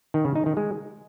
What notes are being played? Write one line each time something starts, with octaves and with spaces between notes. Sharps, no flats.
D#3
C#3
D#4
D#3
G#3